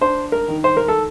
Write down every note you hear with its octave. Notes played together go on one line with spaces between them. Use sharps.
D4 C5
A#4
D#3
C5
A#4
A4